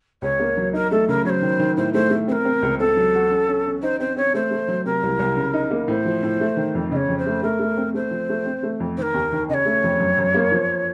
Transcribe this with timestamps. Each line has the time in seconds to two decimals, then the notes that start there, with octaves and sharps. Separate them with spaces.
0.22 C#2 C#5
0.40 A#3
0.57 F#3
0.73 D#4 A#4
0.91 A3 A4
1.08 C#3 A#4
1.25 F#3 C#5
1.29 C5
1.42 D#3
1.59 D#3
1.77 A2 C5
1.93 A3 C5
2.10 A3
2.28 C4 C5
2.32 A#4
2.45 C4
2.62 C#2
2.79 C4 A4
2.97 F#3
3.14 F#4
3.31 C#4
3.48 C#4
3.66 C#4
3.82 D#4 C5
4.00 C4 C5
4.16 C4 C#5
4.34 A3 C5
4.51 A3
4.68 F#3
4.85 C3 A#4
5.03 C2
5.19 C2
5.36 C#3
5.54 D#4
5.71 A#3
5.88 A2 C5
6.05 F3
6.23 A2
6.40 A3
6.57 D#3
6.75 F2
6.91 C#3 D#5
6.96 C#5
7.08 F2
7.18 C5
7.26 A3
7.43 A3 A#4
7.59 A3
7.77 C4
7.94 A3 C5
8.11 F3
8.29 A3
8.46 C4
8.63 A3
8.80 F2
8.97 D#3 A#4 C5
9.14 D#2
9.32 D#3
9.49 C#3 C#5 D#5
9.65 A3
9.84 F2
10.00 F#2
10.18 F#2
10.34 A#3
10.52 F3